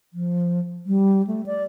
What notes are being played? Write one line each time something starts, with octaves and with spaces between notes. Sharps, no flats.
F3
G3
A3
D5